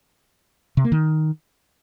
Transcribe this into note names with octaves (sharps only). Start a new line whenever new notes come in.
C3
A#3
D#3